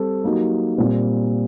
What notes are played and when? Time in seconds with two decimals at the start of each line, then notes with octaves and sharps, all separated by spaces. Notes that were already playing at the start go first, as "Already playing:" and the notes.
Already playing: G3 C4 A4
0.24 F#3 A#3 D#4 G4
0.78 A#2 G3 C4